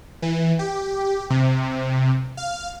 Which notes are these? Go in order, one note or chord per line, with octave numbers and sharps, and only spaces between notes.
E3
G4
C3
F5